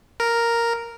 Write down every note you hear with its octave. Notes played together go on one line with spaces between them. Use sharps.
A#4